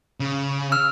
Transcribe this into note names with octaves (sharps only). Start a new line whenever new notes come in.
C#3
E6 F6